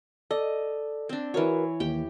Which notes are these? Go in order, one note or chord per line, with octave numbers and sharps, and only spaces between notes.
A4 D5 D#5
C4 D4
E3 F#4 A#4 B4 C#5
D#2 G4 G5